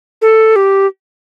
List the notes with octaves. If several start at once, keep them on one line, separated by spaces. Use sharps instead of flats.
A4
G4